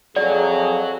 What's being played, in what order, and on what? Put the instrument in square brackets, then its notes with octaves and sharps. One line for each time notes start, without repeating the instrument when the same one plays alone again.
[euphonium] F2 [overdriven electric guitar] F#4 C#5 [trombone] G#4 [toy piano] D5